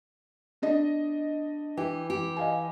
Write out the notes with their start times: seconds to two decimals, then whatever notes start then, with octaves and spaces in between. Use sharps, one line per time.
0.62 B3 D4 D#5
1.77 E3 G4
2.10 G4
2.37 D#5 F5 G#5